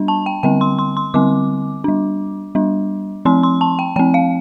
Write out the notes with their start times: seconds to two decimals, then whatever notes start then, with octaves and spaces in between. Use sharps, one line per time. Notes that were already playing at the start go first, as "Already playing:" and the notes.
Already playing: G3 D4
0.08 A5
0.26 G5
0.43 D3 G3 C4 G5
0.61 C6
0.79 C6
0.97 C6
1.14 D3 G3 C4 D6
1.84 G3 D4
2.55 G3 D4
3.25 F3 C4 C6
3.43 C6
3.61 A5
3.79 G5
3.96 F3 C4 G5
4.14 F5